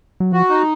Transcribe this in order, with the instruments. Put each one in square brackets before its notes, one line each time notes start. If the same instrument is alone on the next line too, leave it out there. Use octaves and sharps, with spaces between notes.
[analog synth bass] F#3
[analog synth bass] F3 [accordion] F#4
[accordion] D#4